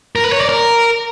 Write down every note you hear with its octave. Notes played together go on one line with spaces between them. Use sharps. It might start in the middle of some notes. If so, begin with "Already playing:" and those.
A#4
B4
C#5
D5
A#4